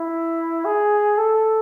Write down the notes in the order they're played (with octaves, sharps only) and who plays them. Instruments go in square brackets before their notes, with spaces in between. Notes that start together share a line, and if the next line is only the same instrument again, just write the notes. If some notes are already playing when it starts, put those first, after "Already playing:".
Already playing: [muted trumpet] E4
G#4
A4